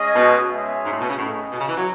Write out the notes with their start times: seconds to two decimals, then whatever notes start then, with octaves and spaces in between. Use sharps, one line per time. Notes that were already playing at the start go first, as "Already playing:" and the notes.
Already playing: G#3 C#4 G#4 D#5
0.14 B2
0.49 G#3 C#4 G#4 C#5 E5
0.83 G#2
0.91 A2
0.99 B2
1.08 C#3
1.17 A2 D#4 G#4 D#5
1.51 B2
1.60 C#3
1.68 E3
1.76 F#3